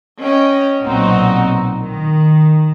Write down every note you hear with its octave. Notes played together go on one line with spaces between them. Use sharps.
C#4 D#5 G5
B1 A#2 C4 D#4 F#4
D#3